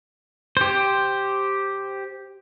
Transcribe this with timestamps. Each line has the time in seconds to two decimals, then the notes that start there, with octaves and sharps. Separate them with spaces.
0.57 G4 C5